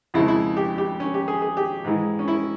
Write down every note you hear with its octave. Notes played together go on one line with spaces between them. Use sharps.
F2 C#3 F3 G#3 E4
E4
G4
G4
C#4
G4
G#4
G#4
G4
G#2 E3 G#3
C#4
E4